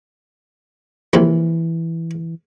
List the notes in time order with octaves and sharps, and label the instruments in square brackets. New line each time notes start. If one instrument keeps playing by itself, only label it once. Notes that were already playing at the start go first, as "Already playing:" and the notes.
[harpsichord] A#1 C3 [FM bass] E3